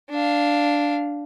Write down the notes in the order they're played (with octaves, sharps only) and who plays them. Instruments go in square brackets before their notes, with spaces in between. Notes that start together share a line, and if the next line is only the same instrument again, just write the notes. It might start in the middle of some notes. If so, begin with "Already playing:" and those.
[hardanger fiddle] D4 F5